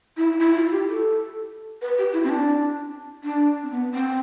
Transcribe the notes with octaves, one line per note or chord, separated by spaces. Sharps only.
E4
E4
F4
G4
A4
B4
G4
E4
C4
D4
D4
C4
B3
C4